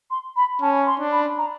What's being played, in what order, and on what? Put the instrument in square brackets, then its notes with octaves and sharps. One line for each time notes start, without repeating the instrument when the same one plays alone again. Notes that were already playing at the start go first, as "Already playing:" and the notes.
[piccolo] C6
B5
[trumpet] C#4 [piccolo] A5
[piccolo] C6
[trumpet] D4
[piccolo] B5
A#5